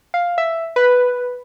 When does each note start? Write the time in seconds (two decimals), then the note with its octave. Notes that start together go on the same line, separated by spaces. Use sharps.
0.14 F5
0.38 E5
0.76 B4